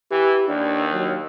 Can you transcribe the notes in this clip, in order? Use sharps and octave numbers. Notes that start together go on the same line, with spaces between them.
E3 G4
D#2 D4
F#3